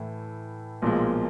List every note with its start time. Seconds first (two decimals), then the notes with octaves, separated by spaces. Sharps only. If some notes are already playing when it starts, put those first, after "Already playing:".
Already playing: A2 E3 A3
0.82 B1 A#2 F3 G#3